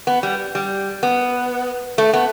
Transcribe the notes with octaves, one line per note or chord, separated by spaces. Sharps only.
B3
G3
G3
B3
A3
B3